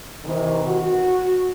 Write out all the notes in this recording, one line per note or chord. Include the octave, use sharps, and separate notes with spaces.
C3 D#3 E3
F#4